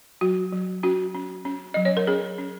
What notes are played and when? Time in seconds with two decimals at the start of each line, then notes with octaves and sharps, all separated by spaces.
0.21 F#3 F#4
0.53 F#3
0.83 C#4 F#4
1.15 C#4
1.45 C#4
1.74 F#3 D#5
1.85 C#5
1.97 A#4
2.07 C#4 G#4
2.38 C#4